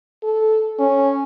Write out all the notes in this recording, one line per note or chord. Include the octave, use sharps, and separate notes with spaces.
A4
C#4